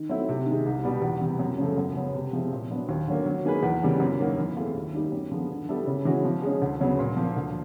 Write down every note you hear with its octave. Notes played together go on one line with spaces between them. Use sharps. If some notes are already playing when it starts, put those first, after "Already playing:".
Already playing: D#3
F#3 A3 C4 E4
C3
D#3 G#3
C2
B2 G3 B3
E2
C3 E3
F#2
C#3 F3 A3
F#2
C#3 F#3 B3
C3
F3 G#3 C4 E4
A#2
F#3 B3 D4
D#2
D3 F#3 A#3
F#3
A#3 D#4 G#4 B4
E2
C#3 E3 G3 A#3
F#2
D#3 F#3 A#3
E3
A3 C4 F4 G#4
D#2
D#3 G3 A#3 D#4
F#2
D3 F3 G#3 B3
D3
G3 B3 E4 A4
C#3
E3 G#3 C#4 F#4
F3
G#3 C#4
D2
C#3 F#3 B3
A#2
F3 A#3
D2